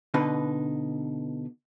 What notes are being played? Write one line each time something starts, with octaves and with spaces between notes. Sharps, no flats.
B2 D3 D#4 B4